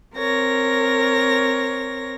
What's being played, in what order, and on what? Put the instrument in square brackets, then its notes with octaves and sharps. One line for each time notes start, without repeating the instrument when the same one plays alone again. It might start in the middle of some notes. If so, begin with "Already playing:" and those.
[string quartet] C4 A#4 C#5 A#6